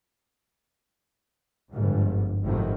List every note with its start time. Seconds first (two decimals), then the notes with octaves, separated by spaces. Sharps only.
1.69 G1 F2 G#2
2.43 G#1 A2 C3 D#3 F3 F#3